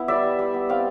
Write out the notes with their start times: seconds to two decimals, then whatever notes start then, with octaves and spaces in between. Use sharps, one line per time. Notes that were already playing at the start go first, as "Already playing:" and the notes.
Already playing: B3 E4
0.08 G3 D5 E5
0.23 G3
0.39 G3
0.54 B3
0.69 C4 F5 G5